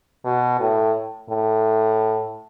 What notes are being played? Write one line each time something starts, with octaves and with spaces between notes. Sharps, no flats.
B2
A2
A2